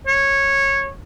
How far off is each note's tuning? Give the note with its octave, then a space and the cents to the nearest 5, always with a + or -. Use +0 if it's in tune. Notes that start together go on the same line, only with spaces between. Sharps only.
C#5 -15